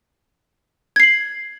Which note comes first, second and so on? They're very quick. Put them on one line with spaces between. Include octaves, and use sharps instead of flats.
G#6 C7 F#7